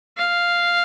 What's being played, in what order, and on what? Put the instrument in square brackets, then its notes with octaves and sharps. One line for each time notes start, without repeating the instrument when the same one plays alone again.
[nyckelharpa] F5